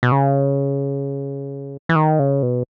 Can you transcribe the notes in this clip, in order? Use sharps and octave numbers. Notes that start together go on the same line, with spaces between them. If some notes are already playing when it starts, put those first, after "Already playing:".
B2
C#3
E3
D#3
C#3
B2